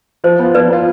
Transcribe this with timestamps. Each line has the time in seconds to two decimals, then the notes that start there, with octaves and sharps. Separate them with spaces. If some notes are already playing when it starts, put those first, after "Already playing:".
0.24 F3 C5
0.39 B3 F4
0.54 F3 B4 D5
0.70 B3 F4